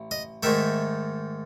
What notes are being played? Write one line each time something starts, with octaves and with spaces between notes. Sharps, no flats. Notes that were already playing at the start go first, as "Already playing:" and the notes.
Already playing: A1
D#5
G#2 D#3 A3 E5